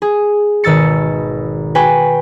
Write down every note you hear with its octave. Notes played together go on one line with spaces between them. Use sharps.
G#4
G#1 B2 D#3 E6 A6 C#7
F#4 B4 G5 G#5